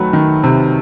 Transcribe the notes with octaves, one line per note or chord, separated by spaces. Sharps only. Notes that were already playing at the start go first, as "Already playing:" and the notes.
Already playing: D#3 F#3 A3 B4
D#3
C3